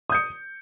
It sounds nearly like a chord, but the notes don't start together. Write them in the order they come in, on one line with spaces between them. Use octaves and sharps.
D#6 G6 C#7